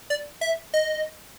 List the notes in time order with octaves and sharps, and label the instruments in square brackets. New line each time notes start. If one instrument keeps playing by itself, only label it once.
[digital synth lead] D5
E5
D#5